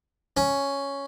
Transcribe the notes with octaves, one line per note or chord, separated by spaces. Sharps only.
C#4